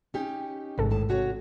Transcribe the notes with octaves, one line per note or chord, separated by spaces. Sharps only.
C#4 D#4 G4
A1 G#2 C3 A4
D#2 A2 A5
C3 F#4 C#5